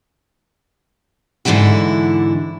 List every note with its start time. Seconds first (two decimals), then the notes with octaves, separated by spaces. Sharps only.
1.45 G#2 D3 E3 D4 E4 F#4